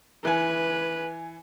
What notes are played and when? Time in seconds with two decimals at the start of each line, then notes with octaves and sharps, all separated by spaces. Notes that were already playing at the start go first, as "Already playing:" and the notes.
0.25 E3 B4 G#5